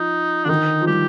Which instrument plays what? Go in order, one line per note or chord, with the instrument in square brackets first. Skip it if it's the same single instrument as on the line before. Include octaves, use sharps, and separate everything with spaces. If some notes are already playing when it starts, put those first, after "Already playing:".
Already playing: [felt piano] F3 [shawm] D#4
[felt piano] D3 [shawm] D4
[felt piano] D#3 [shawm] D#4
[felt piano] F3
[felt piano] G3 [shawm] G4